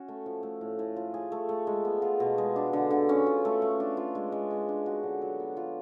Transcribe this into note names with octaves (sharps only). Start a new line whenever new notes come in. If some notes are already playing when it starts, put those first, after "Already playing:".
Already playing: C#4 F#4
A3
F3
A3
A2
A2
F4
G#4
A3
A3
G#3
B3
F4
B2
G#3
D4
D3
D3
C#4
F4
A3
A3
D4
F4
G#3
G#3
G#3
D4
F#4
D3
F#3
B3
F4